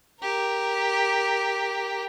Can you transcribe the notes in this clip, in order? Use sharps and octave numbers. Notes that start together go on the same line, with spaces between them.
G4 A#4